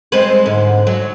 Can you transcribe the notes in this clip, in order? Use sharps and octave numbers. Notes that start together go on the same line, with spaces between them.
G#3 C4 B4
G#2 D3
F#3